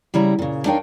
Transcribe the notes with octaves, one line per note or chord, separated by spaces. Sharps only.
C#3 G3 E4 A#5
A#2 C#3
D4 D#4 A#4 C#5 F5 G5